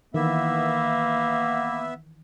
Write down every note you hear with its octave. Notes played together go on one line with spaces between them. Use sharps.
D#3 E3 A#3 B3 E5